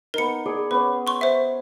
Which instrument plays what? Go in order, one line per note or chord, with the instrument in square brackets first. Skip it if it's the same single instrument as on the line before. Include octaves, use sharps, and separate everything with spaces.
[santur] B3 D#4 [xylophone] A#4 C#7
[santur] G#4 D5 G#5
[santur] B3 C#4 [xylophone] B4
[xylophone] C6 C#6
C5 E5